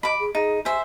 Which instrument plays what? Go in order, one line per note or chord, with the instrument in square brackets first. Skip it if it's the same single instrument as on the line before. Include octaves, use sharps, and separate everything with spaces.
[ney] D#5 [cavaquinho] B5 D6
[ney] G#4
[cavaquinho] D#4 [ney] G#4
[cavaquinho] C5 E5 [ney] G#5